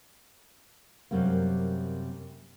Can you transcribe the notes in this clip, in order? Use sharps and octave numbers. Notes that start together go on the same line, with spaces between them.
F#2 C3 G3 A#3